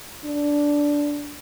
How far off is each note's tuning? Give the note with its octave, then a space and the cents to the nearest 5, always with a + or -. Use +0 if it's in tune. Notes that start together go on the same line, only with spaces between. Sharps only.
D4 -10